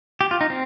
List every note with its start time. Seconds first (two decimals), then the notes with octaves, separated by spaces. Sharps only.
0.21 G4
0.31 F4
0.41 D#4
0.50 C4